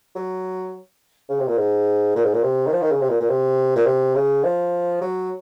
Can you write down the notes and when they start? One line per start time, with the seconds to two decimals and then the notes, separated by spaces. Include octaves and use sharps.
0.15 F#3
1.29 C#3
1.39 C3
1.48 A#2
1.58 G#2
2.16 A#2
2.25 G#2
2.34 A#2
2.43 C3
2.67 D#3
2.72 F3
2.82 D#3
2.92 C#3
3.01 C3
3.10 A#2
3.20 A#2
3.30 C3
3.76 A#2
3.86 C3
4.15 C#3
4.44 F3
5.01 F#3